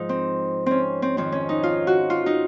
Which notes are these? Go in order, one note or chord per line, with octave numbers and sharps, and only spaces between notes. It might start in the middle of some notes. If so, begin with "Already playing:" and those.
Already playing: G#2 F3 D#4
C4
C4 C#4
C4
F2 D#3 C4
C#4
D#4
F4
F#4
F4
D#4